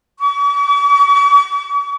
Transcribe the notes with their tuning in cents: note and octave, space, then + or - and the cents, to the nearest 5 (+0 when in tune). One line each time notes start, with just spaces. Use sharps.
C#6 +45